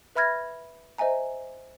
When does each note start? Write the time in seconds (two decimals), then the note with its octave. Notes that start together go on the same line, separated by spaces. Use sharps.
0.15 B4 E5 B5 F6 G#6 A#6
0.98 C5 D#5 E5 G#5 A#5